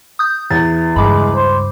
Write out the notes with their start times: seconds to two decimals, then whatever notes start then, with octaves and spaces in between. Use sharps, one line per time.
0.19 D#6 G6
0.51 E2 A6
0.96 C#2 G2 G#3 B5 D6
1.35 C5